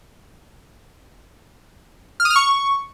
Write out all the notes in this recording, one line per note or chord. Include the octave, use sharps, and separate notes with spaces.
F6
D#6
F6
C#6